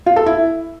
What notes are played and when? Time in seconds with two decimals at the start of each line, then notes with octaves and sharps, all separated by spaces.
0.06 F4
0.16 A4
0.26 E4